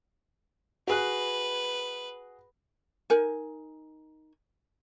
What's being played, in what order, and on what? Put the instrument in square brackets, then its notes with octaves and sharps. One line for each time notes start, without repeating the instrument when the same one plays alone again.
[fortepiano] F#4 G#4 F#6 [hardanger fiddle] B4
[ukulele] D#4 A#4 G#5